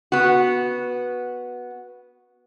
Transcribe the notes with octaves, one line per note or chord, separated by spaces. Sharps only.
B3 F#4